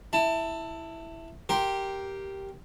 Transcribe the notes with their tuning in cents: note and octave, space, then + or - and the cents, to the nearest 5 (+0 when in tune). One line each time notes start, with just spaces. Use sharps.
E4 +0 A5 +20
G4 -5 A#4 +0 C6 +10